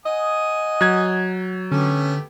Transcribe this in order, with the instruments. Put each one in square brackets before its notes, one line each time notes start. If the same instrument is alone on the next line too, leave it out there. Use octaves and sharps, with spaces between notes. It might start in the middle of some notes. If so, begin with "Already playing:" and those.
[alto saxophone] D#5 [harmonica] F#5 G#5 D#6
[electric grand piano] F#3 G#6 [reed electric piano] F#6
[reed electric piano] D3 [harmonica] A3 B3 G4 [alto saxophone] C#4